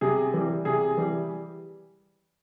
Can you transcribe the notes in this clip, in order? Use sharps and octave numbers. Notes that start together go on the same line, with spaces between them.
C3 G#4
E3 G3
C3 G#4
E3 G3